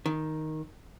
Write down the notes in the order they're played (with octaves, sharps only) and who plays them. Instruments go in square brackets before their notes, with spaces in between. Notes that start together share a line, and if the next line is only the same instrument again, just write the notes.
[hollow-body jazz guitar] D#3